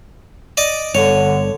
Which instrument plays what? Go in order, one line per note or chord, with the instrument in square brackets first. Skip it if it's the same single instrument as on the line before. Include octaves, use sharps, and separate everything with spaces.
[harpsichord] D5 D#5 D6
[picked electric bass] G1 [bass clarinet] D3 [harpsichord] C#5